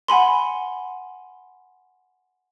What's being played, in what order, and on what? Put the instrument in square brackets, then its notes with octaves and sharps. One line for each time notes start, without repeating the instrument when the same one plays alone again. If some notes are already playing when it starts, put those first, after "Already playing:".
[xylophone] F#5 G#5 B5 C6